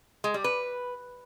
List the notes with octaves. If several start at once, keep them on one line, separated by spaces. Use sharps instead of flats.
G#3
G3
B4